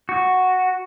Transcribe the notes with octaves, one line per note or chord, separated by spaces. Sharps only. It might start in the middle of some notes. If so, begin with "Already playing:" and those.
F#4